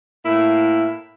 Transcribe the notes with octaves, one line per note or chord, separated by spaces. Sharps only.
A2 A#3 E4